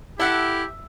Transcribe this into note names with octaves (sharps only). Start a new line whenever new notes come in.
E4 G4 A4 E5 F#5